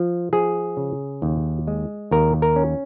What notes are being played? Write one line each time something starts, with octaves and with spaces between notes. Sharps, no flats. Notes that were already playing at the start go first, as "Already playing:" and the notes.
Already playing: F3
F3 G#4
C#3
D#2
G#3
D#2 A#4
A#4
C#4